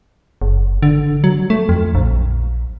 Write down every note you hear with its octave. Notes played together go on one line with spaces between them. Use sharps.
F#1
D3
F#3
A3
F2
A#1